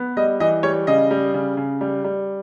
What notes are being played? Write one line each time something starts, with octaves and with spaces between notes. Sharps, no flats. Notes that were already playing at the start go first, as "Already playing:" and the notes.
Already playing: B3
G3 D#5
E3 D#5
G3 C#5
C#3 D#5
G3
C#3
C#3
G3
G3